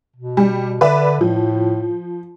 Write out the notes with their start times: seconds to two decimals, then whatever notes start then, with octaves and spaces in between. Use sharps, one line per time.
0.16 B2
0.37 G3
0.81 D3 B4 D5 E5
1.21 A2 F3